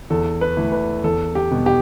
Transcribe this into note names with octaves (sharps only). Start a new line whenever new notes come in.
E2 A4
B4
E3 A3
B4
E2 A4
G4
B2 G3 B3
G4